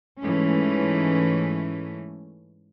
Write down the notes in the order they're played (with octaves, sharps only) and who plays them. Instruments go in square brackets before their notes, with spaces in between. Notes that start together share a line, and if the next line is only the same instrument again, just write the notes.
[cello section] G#2 E3 A3 C#4